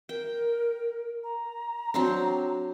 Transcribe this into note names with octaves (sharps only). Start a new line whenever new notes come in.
A#4 G5
A#5
F#3 C4 D4